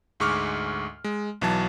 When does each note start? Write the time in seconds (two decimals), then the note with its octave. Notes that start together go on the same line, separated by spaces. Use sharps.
0.20 D2 G#2 G#3 C#6 D6 F6
1.04 G#3
1.41 B1 E3 F#3 A5